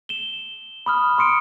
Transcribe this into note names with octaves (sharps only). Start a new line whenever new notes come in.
E7 G7
B5 D#6 F6
C6 D#6 C#7 D7